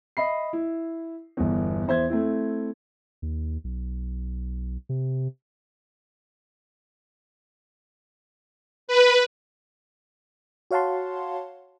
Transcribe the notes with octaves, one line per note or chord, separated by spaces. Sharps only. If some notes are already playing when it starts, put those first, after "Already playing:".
D#5 E5 B5 C7
E4
G1 E2
E2 C5 E5 G#6
A3 C4 E4
D#2
B1
C3
B4
F#4 C#5 F5 F#5 A5 C6